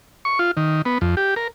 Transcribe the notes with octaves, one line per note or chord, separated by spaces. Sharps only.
C#6
F4
D#3
B3
F2
G4
A#4